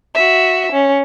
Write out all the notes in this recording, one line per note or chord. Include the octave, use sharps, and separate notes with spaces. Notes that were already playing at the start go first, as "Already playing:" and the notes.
F#4 E5
C#4